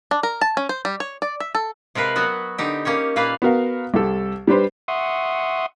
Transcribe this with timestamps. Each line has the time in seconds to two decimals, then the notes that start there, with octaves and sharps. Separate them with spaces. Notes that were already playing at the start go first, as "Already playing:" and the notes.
0.11 D4
0.23 A#4
0.41 A5
0.57 C#4
0.69 C5
0.85 G3
1.00 C#5
1.22 D5
1.40 E5
1.55 A4
1.95 C3 G#3 A#4 B4 F5
2.16 F#3 B3 F#4
2.58 D3 D#4 G4
2.85 A#3 C#4 G4 C#5
3.16 A#2 A#3 B4 F5
3.42 B3 F#4 A#4 F5
3.94 C2 G4 A4
4.47 G3 D4 G4 B4 C5
4.88 E5 F#5 C6 C#6 D#6